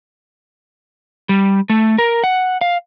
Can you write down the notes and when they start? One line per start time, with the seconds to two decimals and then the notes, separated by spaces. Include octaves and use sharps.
1.29 G3
1.70 A3
1.98 A#4
2.24 F#5
2.61 F5